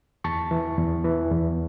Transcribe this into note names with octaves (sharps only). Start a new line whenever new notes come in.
E2 A5 C#6
E3
E2
E3
E2